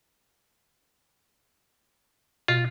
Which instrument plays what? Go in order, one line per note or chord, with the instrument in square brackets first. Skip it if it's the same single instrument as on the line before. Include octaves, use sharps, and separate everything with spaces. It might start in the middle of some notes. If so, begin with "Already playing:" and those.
[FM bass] B2 [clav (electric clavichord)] F4